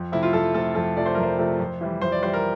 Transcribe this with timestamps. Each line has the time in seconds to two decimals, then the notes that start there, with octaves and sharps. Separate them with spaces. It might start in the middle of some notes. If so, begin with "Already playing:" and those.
Already playing: F2
0.12 C3 F3 A3 E4
0.23 F4
0.33 F2 A4
0.54 C3 F3 A3 A4
0.75 F2 A4
0.96 C3 F3 A3 D5
1.06 C5
1.15 F2 A#4
1.23 C5
1.38 C3 F3 A3
1.59 F2
1.81 E3 G3
2.01 F2 C5
2.12 D5
2.22 E3 G3 C5
2.34 A#4